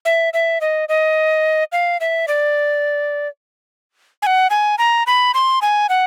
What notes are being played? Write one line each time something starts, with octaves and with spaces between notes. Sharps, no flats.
E5
E5
D#5
D#5
F5
E5
D5
G#5
F#5
G#5
A#5
B5
C6
G#5
F#5